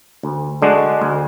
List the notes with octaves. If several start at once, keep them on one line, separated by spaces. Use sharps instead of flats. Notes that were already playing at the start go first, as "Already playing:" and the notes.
D2
D3 G#3 D4 F#4
D2